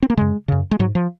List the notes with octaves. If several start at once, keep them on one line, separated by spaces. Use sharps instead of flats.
C4
A#3
F#2 C#3 G#3
F#2 C#3
G#3
G#2 F#3
F3